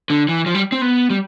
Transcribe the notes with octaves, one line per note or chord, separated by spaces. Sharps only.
D3
E3
F3
G3
C4
B3
G3